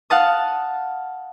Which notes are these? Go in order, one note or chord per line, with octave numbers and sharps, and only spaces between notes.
F5 F#5 A5 D#6